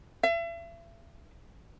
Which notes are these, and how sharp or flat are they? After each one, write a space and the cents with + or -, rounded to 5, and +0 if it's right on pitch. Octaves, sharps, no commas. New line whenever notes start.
E5 +40